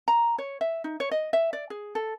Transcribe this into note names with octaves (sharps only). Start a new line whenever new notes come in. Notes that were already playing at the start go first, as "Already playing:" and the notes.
A#5
C#5
E5
D#4
C#5
D#5
E5
D5
G#4
A4